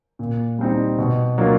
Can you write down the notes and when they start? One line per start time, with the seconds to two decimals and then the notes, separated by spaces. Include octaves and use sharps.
0.19 A#2
0.59 G3 C4 D#4
0.98 B2
1.38 F#3 A#3 D4 F4